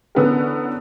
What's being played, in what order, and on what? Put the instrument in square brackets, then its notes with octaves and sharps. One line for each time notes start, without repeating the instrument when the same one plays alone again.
[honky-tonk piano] D3 E3 B3 C#4 G#4 A#4